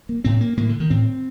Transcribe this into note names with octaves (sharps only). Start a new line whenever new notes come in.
A#3
A2 C4
A#3
A2 A#3
D3
D#3
A2 C4